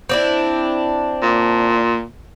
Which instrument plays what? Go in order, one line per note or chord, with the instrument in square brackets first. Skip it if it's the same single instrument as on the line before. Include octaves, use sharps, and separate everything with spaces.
[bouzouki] C4 D4 E4
[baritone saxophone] A#2